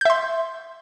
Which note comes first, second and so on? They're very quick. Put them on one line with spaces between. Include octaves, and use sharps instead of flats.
G6 E5 C6